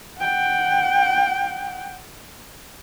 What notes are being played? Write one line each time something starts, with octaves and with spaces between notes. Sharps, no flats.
F#5 G5